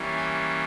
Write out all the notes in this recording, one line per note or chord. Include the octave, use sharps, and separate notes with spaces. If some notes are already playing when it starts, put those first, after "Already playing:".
Already playing: E3 G3 A#3 C#4
G#5